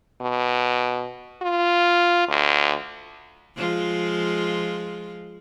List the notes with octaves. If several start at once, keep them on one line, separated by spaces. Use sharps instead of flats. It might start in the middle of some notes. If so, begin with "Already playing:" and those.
B2
F4
D2
F3 G#3 F4